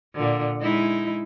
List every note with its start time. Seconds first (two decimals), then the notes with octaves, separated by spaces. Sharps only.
0.15 A#2 D3
0.61 G#3 D#4 E4